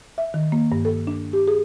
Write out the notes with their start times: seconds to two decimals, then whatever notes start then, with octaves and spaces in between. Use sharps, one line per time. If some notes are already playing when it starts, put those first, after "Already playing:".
0.18 E5
0.34 D#3
0.52 A#3
0.72 G2
0.85 A4
1.07 D4
1.33 G4
1.48 G#4